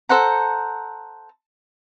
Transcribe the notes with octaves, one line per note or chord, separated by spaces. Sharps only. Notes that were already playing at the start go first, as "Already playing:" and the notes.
A4 C5 F#5 A#5